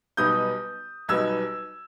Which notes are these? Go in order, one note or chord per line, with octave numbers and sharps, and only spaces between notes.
B1 B2 G3 B3 D#4 D#6 G6
B1 B2 G3 B3 D#4 E6 G#6